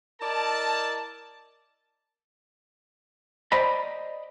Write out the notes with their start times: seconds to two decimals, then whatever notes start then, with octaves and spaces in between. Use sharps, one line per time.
0.21 E4 A#4 D5 D#5 A5
3.52 C5 D5 D#5 A#5 B5